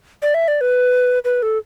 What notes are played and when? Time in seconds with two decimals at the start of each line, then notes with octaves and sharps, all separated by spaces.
0.22 D5
0.34 E5
0.48 D5
0.61 B4
1.25 B4
1.42 A4